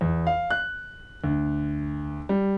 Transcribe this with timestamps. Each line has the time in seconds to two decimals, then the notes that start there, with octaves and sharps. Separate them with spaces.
0.01 E2
0.27 F5
0.50 F#6
1.24 D2
2.29 G3